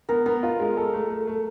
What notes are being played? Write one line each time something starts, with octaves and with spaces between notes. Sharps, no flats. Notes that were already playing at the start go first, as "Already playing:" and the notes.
B3 A#4
B3 A#4
F4
G#3
A4
A3
A3
A3